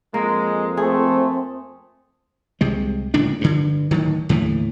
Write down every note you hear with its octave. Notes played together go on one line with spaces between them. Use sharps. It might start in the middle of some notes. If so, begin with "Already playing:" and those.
F2 G#3 A#3
A3 C4 G#4
C2 C3 G#3
D1 C#2 A#2 D4
G2 D3
D1 D#3 F#3
D#2 A2 D3 E3